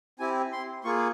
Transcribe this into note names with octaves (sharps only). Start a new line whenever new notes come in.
C4 E4 G4 G#5
C6
A#3 F4 G#4 C#6